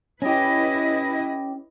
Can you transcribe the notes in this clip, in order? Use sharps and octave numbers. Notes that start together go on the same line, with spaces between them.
C#4 E4 G4 B4 D#5